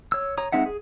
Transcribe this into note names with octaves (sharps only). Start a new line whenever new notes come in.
C#5 E6
C#5 A#5 D#6
G#3 C4 D#4 E5 F#5
G#4